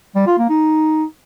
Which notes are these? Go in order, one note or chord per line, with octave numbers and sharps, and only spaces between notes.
G3
F4
A#3
D#4